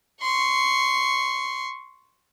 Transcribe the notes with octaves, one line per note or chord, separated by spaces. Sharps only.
C6 C#6